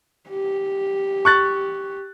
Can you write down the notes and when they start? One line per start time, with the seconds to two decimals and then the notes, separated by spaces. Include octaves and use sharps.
0.30 G4
1.25 C#6 F#6 A6